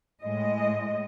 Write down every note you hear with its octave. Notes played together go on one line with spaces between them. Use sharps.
A2 G#3 D#5